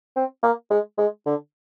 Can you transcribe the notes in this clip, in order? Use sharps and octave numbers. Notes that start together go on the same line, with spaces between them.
C4
A#3
G#3
G#3
D3